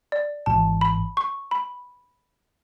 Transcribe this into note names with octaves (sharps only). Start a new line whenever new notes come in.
D5
G#1 G#2 E3 A5
B5
C#6
B5